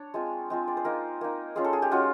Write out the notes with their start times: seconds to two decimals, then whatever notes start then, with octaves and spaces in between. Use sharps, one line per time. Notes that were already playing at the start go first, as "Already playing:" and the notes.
Already playing: D4 C#5
0.14 G#3 C4 F4
0.50 G#3 C4 F4 C5
0.68 D5
0.77 C5
0.85 A#3 D#4 A#4
1.21 A#3 D#4
1.55 G#3 C#4 F4 G#4
1.64 A4
1.73 G#4
1.82 G4
1.91 G#3 C#4 F4 F#4